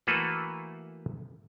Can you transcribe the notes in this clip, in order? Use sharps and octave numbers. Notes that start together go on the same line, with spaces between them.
E3 A3 A#3 F#4 A4 B4